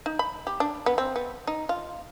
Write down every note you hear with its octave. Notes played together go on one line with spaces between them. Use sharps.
D#4
B5
G4
D4
B3
C4
B3
D#4
F4